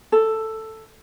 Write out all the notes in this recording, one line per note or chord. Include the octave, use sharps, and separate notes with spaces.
A4